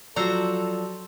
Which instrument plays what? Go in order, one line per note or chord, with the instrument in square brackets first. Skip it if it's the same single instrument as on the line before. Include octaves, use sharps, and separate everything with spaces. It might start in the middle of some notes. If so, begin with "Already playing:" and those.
[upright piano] F3 F#3 [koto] F#4 C5 A#5 [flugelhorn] A4 [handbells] D5 E6